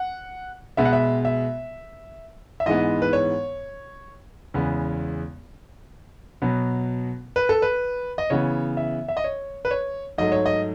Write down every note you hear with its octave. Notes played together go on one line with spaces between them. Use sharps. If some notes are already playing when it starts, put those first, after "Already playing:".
Already playing: F#5
B2 G#3 B3 E5
F#5
E5
E5
E5
G#2 E3 G#3 B3 D#5
B4
C#5
E2 C#3 G#3 B3
B2 F#3 B3
B4
A4
B4
D#5
C#3 E3 B3 C#5
E5
E5
D#5
C#5
B4
C#5
G#2 F#3 A3 D#5
C#5
D#5